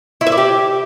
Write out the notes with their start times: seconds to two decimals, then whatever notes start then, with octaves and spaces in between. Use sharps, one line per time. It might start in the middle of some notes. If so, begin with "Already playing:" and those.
0.21 E4
0.27 E5
0.32 D5
0.38 G4